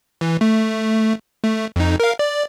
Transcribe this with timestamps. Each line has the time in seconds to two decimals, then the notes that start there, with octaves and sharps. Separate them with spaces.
0.21 E3
0.41 A3
1.44 A3
1.76 F2 D#4
2.00 A#4 F5
2.19 D5